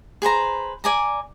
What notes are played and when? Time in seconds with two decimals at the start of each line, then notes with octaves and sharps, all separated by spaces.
0.22 G#4 B4 C5 A#5
0.84 D5 G#5 A#5